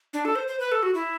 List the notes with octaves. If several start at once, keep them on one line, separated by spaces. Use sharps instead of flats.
D4
A4
C5
C5
B4
A4
F#4
E4